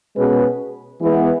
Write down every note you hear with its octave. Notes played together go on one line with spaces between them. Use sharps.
B2 G#3 C#4 G#4 B4
E3 G#3 B3